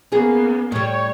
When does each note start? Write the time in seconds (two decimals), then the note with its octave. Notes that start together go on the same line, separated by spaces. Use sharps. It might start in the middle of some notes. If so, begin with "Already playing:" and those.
0.12 A#3 B3 C#4 G#4
0.72 A2 G3 C#5